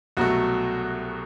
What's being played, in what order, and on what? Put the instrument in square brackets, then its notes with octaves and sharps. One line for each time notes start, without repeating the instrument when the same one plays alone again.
[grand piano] C2 B2 F#3 A3 F#4